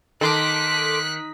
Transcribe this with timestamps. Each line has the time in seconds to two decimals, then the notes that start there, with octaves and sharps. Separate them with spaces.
0.21 D#3 A4 C6 D6 F#6 B6